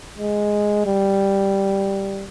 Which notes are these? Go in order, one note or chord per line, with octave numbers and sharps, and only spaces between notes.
G#3
G3